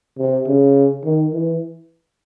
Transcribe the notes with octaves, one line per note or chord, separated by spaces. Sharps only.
C3
C#3
D#3
E3